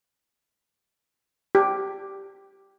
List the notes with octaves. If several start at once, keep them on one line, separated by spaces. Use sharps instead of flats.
G4